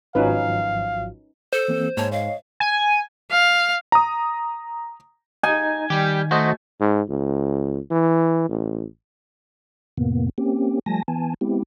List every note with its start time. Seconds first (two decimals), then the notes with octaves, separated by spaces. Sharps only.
0.15 G#1 F3 F#3 C#4 D#4 B4 F5
1.53 A4 C5
1.68 E3 A#3 C4
1.97 G#2 A#3 C#5 A5
2.12 C#5 D#5 F5
2.60 G#5
3.31 F5
3.92 A#5 D#6
5.43 D#4 G#5
5.90 D#3 G3 G4 G5
6.31 A3 F#4 C5 D#5
6.80 G#2
7.09 C#2
7.91 E3
8.49 A1
9.97 F2 A2 C3 A#3 B3
10.38 A#3 C4 C#4 G4
10.86 F3 G3 A3 G#5 A5 A#6
11.08 E3 B3 G#5 A5
11.41 G#3 B3 C4 E4 G4